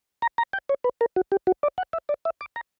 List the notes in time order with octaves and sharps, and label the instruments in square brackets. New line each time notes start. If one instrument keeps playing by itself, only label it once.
[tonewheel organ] A#5
A#5
G5
C#5
B4
A#4
F#4
G4
F#4
D5
F#5
E5
D5
E5
D6
A#5